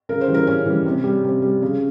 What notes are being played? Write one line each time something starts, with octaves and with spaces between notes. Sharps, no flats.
C#3 A#4
C5
E3 G3
A#4
C#3 C#4
E3 G3
C3
G3
C3
G3
C#3